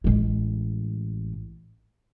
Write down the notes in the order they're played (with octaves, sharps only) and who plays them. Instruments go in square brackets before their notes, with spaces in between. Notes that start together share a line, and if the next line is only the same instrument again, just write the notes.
[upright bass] A1 G#3